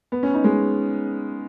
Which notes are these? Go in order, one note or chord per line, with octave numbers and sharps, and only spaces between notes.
B3
C#4
D#4
G#3